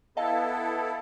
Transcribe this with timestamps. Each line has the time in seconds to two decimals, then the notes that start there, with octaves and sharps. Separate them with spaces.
0.17 B3 E4 A4 D#5 F5 A5